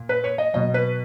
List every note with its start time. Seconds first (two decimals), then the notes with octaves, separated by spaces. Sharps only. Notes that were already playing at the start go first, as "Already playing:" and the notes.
Already playing: A#2
0.09 B4
0.24 C#5
0.38 D#5
0.54 B2 F#3 D#5
0.74 B4